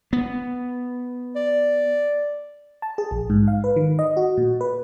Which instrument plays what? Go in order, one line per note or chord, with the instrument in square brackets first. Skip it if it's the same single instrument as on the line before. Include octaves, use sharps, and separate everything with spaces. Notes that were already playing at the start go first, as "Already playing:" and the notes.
[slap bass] B3
[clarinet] D5
[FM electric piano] A5
G#4
A#1
G#2
F5
B4
D#3
D#5
F#4
A#2
B4